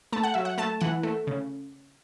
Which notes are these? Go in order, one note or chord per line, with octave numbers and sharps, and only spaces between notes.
A3 A5
F#5
F#3 E5
F#5
A3 A5
E3 F#5
A3
C#3